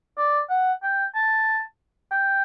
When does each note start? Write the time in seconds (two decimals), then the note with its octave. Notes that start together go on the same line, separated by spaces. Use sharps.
0.18 D5
0.50 F#5
0.83 G5
1.15 A5
2.11 G5